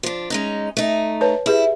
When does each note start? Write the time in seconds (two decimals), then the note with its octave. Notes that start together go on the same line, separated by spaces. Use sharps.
0.03 F3 D4
0.30 G#3 C#4 D#4
0.77 A3 D#4
1.21 B4 C#5 A5
1.46 E4 G4 G#4 B4